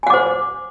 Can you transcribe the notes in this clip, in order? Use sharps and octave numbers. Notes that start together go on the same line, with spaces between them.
C5 F#5 G#5 D6